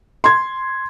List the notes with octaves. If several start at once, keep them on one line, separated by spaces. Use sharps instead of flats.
C6 G#6